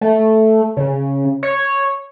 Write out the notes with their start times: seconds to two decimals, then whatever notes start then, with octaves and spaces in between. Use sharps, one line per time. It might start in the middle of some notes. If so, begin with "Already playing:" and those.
0.01 A3
0.77 C#3
1.43 C#5